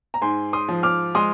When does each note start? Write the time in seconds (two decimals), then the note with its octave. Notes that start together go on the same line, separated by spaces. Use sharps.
0.14 A#5
0.22 G#2 G#5 C6
0.53 C6 D#6
0.69 F3
0.83 D6 F6
1.15 G#3 C6 D#6